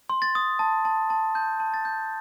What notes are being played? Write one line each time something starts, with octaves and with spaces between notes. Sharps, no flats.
C6
A6
D#6
A5
A5
A5
A5 G6
A5
A6
G6